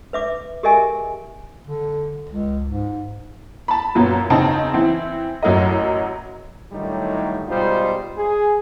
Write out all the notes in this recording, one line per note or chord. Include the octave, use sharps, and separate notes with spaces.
B4 E5 D6
G4 G#4 A#4 D#5 E5 G#5
D3
C#2
G#2
A5 B5
F#2 A#2 F#3 B3
E2 C#3 C4 D#4 A5
E3 C4 E4
A1 F#2 F#3 A#4 D#5
A2 D3 D#3 F#3 G3 D#4
G#2 B2 G3 D#4 F4 C5
G#4